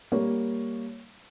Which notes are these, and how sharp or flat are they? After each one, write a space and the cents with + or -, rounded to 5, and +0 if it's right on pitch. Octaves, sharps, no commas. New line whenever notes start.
G3 +0 A#3 +0 C#5 +0